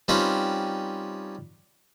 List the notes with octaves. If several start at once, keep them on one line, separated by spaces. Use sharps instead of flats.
G3 C4 C#4 D#4 F4 B4